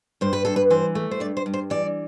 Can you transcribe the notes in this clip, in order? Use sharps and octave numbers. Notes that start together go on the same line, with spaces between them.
G2 C5
B4
G2 A4
B4
E3 C5
A3
C5
G2 D5
C5
G2
C5
E3 D5